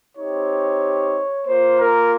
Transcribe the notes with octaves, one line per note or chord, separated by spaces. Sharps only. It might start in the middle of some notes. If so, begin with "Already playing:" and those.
C4 D#4 G4 C#5
A#3 F4 C5
A#4